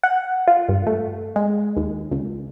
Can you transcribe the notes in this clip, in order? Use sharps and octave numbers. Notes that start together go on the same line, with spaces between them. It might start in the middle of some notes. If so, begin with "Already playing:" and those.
F#5
F4
G2
A3
G#3
D#2
C#2